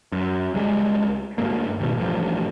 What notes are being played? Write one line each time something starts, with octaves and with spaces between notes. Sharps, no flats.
F#2
C#2 G3 G#3
D2 G2 G#3 A#3
D#1 G#1 B2
A1 G2 F3